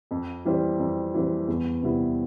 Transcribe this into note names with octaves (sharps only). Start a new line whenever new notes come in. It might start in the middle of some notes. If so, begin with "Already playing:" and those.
F2
E3 G3 C4
F2
E3 G3 C4
E2
C3 G3 B3 E4